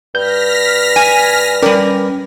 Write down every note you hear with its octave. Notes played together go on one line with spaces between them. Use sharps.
G2 F6 G6 A#6 B6
G#5
G3 C#4 A#4 D5 G5